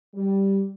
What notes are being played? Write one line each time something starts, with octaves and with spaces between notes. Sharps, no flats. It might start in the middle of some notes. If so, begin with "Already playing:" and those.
G3